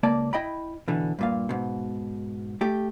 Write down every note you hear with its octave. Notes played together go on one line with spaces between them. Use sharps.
C#2 A#3 D5 A5
E4 D#5 G5 B5
B2 D3 E3
G2 A#2 F5
G#2 B2
A3 G4